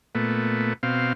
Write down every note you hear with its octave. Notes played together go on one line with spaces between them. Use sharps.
A#2 A3 B3
B2 C4 F5